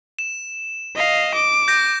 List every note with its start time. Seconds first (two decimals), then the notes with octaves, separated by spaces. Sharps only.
0.19 E7
0.96 D#5 F5
1.34 D6
1.68 G6 A#6